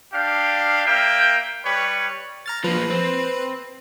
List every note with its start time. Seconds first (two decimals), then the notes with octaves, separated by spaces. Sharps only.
0.13 D4 G4 F5
0.86 A#3 E5 G5
1.64 G3 B4 C#5
2.46 A#5 F6 A6
2.64 F3 A#3 B4
2.90 C4